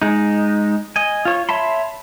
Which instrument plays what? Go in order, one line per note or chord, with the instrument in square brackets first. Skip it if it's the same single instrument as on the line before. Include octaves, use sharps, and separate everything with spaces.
[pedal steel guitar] G#3 D#4
D#5 G#5
F4 C#5
C#5 E5 A5 B5 C6